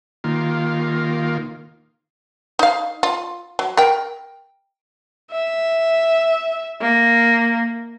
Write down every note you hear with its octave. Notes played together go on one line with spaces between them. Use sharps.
D#3 A#3 F4
D#4 F5
F4
F#3
A#4 G5
E5
A#3